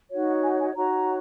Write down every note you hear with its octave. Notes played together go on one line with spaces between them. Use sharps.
D#4 F#4 C#5
F#5
G#5
G#5
D#4 F#4 C#5 A#5